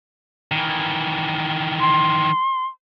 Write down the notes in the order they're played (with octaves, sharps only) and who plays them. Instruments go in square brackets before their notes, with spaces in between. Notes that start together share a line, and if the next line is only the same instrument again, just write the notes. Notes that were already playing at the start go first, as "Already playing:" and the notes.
[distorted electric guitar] D#3 E3
[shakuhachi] C6